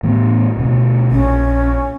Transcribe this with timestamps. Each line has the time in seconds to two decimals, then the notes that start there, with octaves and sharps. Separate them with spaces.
0.03 A2 E3 B3
0.57 D2 B2
1.11 A#1 C#4